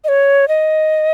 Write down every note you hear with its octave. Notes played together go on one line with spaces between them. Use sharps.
D#5
C#5
D#5